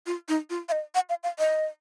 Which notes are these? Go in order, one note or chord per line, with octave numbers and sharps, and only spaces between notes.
F4
D#4
F4
F5
D#5
F#5
F5
F5
D#5